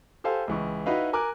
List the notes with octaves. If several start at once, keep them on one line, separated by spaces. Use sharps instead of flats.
G4 A4 C5 F5 G#5
C#2 E3 C#6
D#4 E4 F#4 B4 D#5 F5
A#4 G#5 D6 F#6